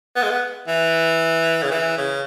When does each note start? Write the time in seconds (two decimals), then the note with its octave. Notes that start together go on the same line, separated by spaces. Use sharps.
0.16 B3
0.22 G#3
0.30 B3
0.68 E3
1.63 C#3
1.71 E3
1.98 C#3